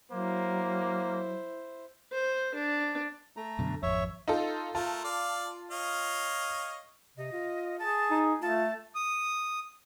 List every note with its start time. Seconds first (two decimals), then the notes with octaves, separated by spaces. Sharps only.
0.12 F#3 A#3 E4 C5
2.12 C5
2.54 D4
3.37 A3 A#5
3.59 F#2 B2 D3
3.83 G#1 F2 C#5 E5
4.28 D#4 F4 A4
4.75 A3 F4 A#4 A5
5.04 D5 F5
5.71 C#5 D#5 F5
7.17 C3 D#5
7.33 F4
7.79 G#4 A5
8.11 D#4
8.42 A3 F4 A5
8.95 D#6